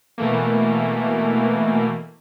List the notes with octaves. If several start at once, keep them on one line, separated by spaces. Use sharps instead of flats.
B2 E3 A3 A#3